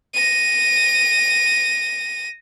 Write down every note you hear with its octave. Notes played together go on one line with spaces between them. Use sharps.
A#6 D#7